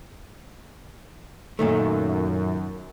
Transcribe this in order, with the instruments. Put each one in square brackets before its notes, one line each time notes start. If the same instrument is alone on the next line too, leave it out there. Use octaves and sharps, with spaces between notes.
[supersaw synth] F#2 [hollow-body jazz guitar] A#2 D#3 A3